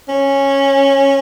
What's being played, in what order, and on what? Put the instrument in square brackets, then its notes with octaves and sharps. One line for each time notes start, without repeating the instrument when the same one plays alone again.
[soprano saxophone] C#4